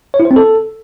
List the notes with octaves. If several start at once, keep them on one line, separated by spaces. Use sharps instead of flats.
C#5
E4
C5
C4
A4